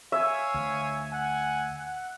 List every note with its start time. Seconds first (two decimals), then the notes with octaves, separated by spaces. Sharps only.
0.12 C#5 E5 F5 G#5
0.54 D2
1.11 F#5 G#5
1.75 F#5